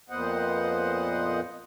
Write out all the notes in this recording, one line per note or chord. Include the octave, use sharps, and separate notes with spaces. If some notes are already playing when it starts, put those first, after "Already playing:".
F2 A#2 B3 C5 D#5 F#5